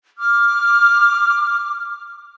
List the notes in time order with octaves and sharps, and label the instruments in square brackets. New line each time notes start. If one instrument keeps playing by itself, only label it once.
[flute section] D6 F6